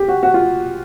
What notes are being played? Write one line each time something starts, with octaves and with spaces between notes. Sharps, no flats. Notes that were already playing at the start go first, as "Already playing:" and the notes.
Already playing: G4
F#4
F#4
F4